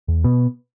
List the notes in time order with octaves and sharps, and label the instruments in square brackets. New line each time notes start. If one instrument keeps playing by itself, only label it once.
[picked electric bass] E2
B2 B3